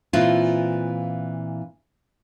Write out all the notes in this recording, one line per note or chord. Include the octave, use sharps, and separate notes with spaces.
A#2 E3 C4 E4 F4